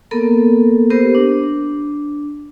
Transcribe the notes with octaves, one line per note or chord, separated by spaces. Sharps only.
A#3 B3 A4 A#4
B3 G4 A#4 C5
D4